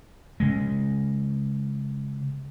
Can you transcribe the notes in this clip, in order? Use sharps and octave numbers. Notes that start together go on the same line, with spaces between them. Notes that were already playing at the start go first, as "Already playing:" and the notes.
C#3 G#3